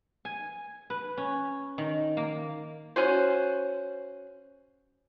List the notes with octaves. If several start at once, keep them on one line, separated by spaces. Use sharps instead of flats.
G#5
B4
C#4
D#3
A#3
C#4 F#4 C5